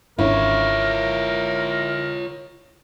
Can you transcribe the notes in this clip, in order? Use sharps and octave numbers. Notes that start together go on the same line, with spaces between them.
G#1 C#4 D4 E4 F4 A#4 C#5